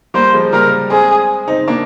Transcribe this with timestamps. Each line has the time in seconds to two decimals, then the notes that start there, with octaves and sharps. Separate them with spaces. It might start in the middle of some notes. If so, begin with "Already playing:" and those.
0.14 G3 A#3 C5
0.33 F3 G#3
0.44 G#3
0.53 G3 A#3 A#4
0.90 G#3 C4 G#4
1.48 C4 D#4
1.68 A#3 D4